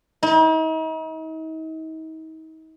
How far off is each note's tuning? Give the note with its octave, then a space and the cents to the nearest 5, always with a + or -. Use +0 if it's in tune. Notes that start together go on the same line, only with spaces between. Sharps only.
D#4 +40